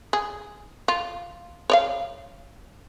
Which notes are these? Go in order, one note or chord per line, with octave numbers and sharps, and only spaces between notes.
G#4
F4
C#5 D5 F5